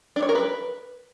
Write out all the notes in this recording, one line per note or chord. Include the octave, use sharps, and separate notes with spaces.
D4
C#5
A#4
B4